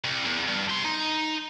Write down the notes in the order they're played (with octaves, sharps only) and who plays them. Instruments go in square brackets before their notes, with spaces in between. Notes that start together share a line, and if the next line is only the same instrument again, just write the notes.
[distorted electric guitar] C2
E2
G2
G4 C6
D#4